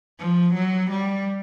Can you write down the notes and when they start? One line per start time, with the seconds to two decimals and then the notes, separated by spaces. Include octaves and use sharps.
0.19 F3
0.54 F#3
0.90 G3